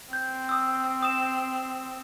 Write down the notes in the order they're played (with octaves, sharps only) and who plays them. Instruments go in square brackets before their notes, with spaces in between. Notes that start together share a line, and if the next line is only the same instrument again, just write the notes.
[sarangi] C4 [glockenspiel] G6
[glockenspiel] D#6 E6
D#6 E7